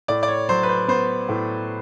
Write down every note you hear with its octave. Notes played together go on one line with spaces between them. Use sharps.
A2 D5
D5
C#5
F#3 C5
B4
C5
B3 C5
A2